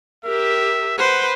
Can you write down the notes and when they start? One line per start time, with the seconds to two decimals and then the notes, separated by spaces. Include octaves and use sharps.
0.25 G4 A#4 E5
0.98 B4 C5 F#5